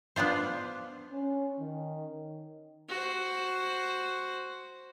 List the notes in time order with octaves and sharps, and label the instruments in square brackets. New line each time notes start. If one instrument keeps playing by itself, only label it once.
[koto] B3 D4 F4 C5
[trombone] C#4
D#3
[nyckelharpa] F#4 C5